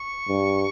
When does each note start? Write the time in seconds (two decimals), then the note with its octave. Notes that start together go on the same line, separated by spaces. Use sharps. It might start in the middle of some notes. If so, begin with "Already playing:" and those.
Already playing: C#6
0.28 G2